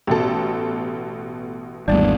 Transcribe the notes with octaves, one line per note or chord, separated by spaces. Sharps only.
A1 B2 A4 G5
G#1 E2 G3 A3 D4